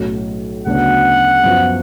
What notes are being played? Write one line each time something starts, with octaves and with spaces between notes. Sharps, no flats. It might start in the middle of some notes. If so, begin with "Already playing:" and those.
Already playing: B1 A2 F#3 C#4
D2 C#3 F#3 B3 D4 F#5
F#2 F3 B3